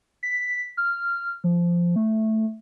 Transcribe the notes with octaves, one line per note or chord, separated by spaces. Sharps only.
B6
F6
F3
A3